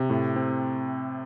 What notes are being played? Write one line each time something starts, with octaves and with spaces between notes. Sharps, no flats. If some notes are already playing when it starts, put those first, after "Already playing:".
Already playing: C3
A2
C4